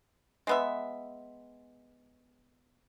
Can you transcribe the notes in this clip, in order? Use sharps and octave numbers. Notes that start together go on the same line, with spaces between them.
G#3 B3 E5